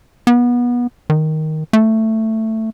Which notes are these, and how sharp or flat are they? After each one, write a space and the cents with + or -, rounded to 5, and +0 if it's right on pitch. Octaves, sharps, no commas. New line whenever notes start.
B3 -25
D#3 +5
A3 +10